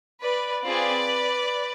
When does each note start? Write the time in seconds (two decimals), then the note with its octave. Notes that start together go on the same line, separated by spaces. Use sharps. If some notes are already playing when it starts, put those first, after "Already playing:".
0.21 B4 D5
0.64 C4 F4 G#4 B4 D5